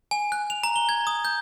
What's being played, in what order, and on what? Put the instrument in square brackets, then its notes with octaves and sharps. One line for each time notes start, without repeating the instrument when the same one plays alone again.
[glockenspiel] G#5
F#6
F7
A#5
G7
G#6
D#6
G6